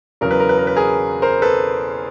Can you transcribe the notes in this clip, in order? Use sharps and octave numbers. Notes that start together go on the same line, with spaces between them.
E2 C#3 F#3 A#4
B4
A#4
B4
A#4
B4
G#4 A#4
A#4 C5
A4 B4